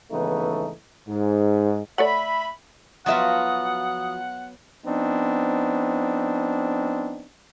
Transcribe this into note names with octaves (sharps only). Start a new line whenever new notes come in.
G#1 C#3 E3 A3 B3 D#4
G#2
A3 A4 C#5 D5 E5 F#5 B5
F3 F#3 B3 F4 F#4 E5 F#5 D#6
F3 B3 C4 D4 D#4